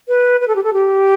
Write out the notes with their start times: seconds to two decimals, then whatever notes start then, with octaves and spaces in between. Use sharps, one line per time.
0.08 B4
0.41 B4
0.48 A4
0.56 G4
0.64 A4
0.73 G4